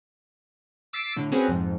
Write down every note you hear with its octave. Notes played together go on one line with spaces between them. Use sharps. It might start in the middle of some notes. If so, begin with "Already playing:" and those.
D6 E6 A6 B6 C7 D7
A2 D3
C4 C#4 F#4 G#4 B4
F2 G#2